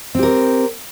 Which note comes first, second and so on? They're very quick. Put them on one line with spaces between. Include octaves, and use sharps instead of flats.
C4 G4 A#4